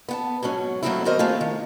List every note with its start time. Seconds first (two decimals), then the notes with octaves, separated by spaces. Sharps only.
0.09 B3 F#5 A5
0.43 G#2 B2 F#3 C#4
0.83 F#3 A3 A#3 C4 D#4 E4
1.05 D#3 B3 F#4 A#4 C5 D#5
1.19 A3 A#3 C4 F4 G#4
1.41 D#3